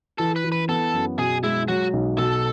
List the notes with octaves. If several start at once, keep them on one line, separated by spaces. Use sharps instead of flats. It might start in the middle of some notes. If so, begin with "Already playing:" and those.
E3 A4
B4
E3
B4
B3 A4
F#2
B2 G#4
G#3 E4
F#3 F#4
B1
B2 A4